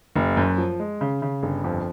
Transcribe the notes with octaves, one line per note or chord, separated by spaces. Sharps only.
F#1
F#2
F3
G#3
C#3
C#3
G1
F2